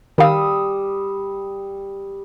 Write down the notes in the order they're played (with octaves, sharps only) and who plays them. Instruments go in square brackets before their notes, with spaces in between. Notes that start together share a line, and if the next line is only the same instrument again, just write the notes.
[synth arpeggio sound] D#3 F5 [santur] G3 D#6 E6